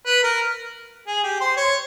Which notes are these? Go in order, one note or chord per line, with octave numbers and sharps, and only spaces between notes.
B4
A#4
G#4
G4
C5
C#5